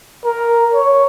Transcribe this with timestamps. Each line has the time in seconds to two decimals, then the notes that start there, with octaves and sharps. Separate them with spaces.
0.25 A#4
0.74 C#5